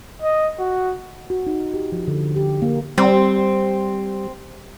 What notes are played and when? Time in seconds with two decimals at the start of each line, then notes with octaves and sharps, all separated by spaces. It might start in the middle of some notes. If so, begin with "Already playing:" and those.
0.22 D#5
0.59 F#4
1.30 F#4
1.47 D#4
1.74 G4
1.92 F3
2.08 D3
2.36 G4
2.62 A#3
2.98 G3 C4